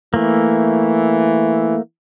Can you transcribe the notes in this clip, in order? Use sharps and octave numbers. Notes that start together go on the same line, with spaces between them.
E3 A3 A#3